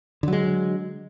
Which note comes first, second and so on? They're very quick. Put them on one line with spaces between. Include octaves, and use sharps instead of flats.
D3 F#3 G#3